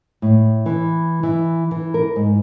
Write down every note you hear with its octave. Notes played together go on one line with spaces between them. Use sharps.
A2
E3
E3
E3
A#4
G#2